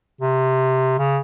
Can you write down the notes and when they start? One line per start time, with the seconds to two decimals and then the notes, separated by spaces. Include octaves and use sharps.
0.21 C3
0.98 C#3